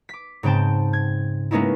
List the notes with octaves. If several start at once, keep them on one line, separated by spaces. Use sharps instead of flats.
D6 B6
G#2 C#3 C4 G5 A5
G#6
G#3 A#3 B3 C#4 D#4 E4